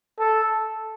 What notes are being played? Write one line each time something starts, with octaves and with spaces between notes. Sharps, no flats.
A4